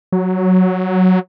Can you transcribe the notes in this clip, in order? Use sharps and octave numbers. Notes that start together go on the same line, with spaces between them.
F#3